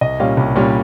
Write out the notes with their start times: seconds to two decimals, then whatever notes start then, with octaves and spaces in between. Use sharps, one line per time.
0.01 C2 D#5
0.20 A#2 G3 C#4 F5
0.37 C2
0.56 A#2 G3 C#4